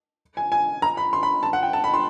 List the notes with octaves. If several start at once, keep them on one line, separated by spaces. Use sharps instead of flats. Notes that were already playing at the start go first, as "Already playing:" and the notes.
G#5
G#5
A#5
B5
C6
B5
A5
F#5
G5
A5
B5
C6